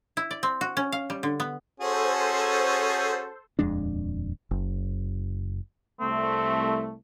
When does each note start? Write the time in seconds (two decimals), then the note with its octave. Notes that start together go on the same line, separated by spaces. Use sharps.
0.17 E4
0.31 D5
0.43 C4
0.61 F#4
0.77 C#4
0.92 F5
1.10 G3
1.23 D3
1.40 B3
1.80 C#4 F#4 G#4 A4 C5
3.59 D#1 F2 G#3 D4
4.51 F#1
6.00 C2 A3 C4